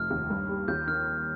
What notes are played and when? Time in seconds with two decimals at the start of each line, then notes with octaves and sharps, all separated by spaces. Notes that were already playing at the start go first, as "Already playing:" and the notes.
Already playing: F1 F6
0.10 D#2
0.30 G2
0.49 G3
0.68 D#2 G6
0.87 D#3 F6